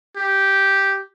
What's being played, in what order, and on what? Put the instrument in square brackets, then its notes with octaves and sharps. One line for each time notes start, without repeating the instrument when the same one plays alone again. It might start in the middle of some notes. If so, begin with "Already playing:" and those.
[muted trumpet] G4